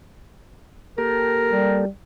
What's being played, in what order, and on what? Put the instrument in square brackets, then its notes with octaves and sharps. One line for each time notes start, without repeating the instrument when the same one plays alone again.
[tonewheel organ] A#3 G4 A4 [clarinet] A#4
[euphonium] G3